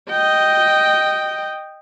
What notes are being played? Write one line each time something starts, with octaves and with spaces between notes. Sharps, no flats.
D#5 G5